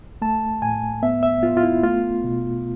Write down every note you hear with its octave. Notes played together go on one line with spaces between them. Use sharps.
A3 A5
A2 G#5
B3 E5
E5
B3 F4
F4
E4
A3 F4
B2